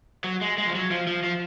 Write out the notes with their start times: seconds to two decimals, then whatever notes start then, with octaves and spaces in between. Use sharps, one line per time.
0.24 F#3
0.41 G#3
0.58 G#3
0.67 F3
0.75 F#3
0.91 F3
1.07 F3
1.24 F3